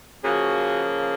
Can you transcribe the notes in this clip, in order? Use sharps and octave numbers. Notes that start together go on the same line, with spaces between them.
C#3 F3 A#3 F#4 G#4